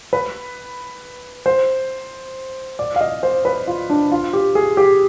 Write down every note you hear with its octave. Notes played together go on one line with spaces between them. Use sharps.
B4
C5
D5
F5
D#5
C5
B4
F4
D4
F4
G4
G#4
G4